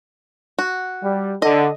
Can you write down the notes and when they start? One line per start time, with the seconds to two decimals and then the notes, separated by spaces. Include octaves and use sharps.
0.59 F#4
1.02 G3
1.42 D3 D#5